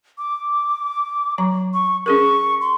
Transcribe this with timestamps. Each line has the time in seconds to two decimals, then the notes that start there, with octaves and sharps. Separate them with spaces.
0.18 D6
1.38 F#3 A#5
1.74 C#6
2.06 C#4 G#4 A#4 C#6
2.61 C6